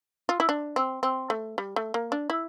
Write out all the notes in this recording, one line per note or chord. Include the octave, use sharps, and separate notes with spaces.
F4
E4
D4
C4
C4
A3
G3
A3
A#3
D4
E4